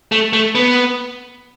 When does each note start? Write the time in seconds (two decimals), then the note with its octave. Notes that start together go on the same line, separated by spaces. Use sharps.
0.12 A3
0.33 A3
0.55 B3